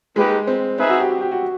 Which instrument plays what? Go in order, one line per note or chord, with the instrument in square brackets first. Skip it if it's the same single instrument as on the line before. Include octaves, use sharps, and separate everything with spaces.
[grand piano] G#3 [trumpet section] A#3 D#4 G4 B4
[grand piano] C4
[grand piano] C4 [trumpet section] D#4 G#4 B4 E5
[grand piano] F#4
G4
G4
G4
F#4